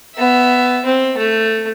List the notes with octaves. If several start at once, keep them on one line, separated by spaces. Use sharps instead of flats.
B3 E5
C4
A3